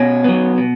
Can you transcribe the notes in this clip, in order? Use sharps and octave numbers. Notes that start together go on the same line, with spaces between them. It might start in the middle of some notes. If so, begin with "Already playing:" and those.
Already playing: B2 C#4
F#3 B3
B2